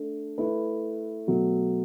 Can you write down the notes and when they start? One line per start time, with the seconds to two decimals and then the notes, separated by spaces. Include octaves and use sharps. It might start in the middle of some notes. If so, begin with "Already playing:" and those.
Already playing: A3 D4 A4
0.38 A3 E4 B4
1.27 B2 F#3 A3